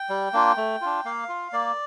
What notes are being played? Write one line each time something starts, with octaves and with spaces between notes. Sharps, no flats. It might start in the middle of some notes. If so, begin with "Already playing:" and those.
Already playing: G5
G3
A#3 D4 F4
A3
D4 F4
A#3 F5
F4
A#3 D5